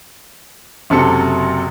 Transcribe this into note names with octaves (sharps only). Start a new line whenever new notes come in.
F#1 C3 F#3 A4 C#7